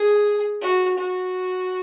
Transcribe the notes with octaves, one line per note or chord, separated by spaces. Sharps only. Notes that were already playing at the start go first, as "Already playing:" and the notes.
Already playing: G#4
F#4
F#4